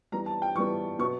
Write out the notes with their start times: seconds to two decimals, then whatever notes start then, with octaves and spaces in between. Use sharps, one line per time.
0.12 E3 G3 B3 A#5
0.26 A5
0.42 G5
0.55 E3 C#6
0.58 G3 B3
0.99 B2 F#3 B3 C#6